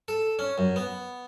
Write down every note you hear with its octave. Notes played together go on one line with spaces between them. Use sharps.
A4
C#4
F#2
B3